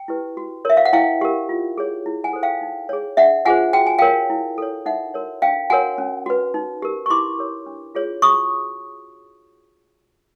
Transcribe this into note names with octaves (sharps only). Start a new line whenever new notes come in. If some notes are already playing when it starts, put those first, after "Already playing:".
Already playing: G5
E4 G4 B4
F#4
A#4 C#5 E5
F5
F#5
E4 F5 G5
G4 A#4
F4
G#4 C#5
E4
F#5 G#5
A4 C5
F5 G5
D#4
G#4 C#5
D4 E5 F#5
F4 G#4 C5 F#5 G#5
F#4 G5
G#5
A#4 C#5 F5 G5
E4
A4 C#5
D#4 E5 F#5
F#4 A#4 C#5
D4 F5 G5
F#4 A#4 C#5 F#5 G#5
C#4
F#4 B4
D#4
G4 A#4
C#6
E4 C6 D6
G4 A#4 C#5
D4
F4 G#4 C#5
F#4 C#6 D#6